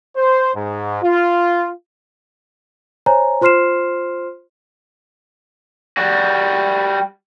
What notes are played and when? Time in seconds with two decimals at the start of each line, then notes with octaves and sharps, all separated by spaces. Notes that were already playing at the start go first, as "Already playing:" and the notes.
0.16 C5
0.55 G#2
1.03 F4
3.06 C5 C#5 G#5 A#5
3.41 F4 C5 C6 F6 C7 E7
5.97 G3 F#4